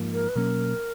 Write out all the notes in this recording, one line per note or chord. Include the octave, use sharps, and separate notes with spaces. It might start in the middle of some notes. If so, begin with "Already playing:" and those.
Already playing: G#2 F3 A#3
A#4
B4
B2 F#3 A#3 C#4 A#4